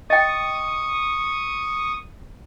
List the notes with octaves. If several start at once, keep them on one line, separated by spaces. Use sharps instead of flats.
D#5 G5 C#6 D#6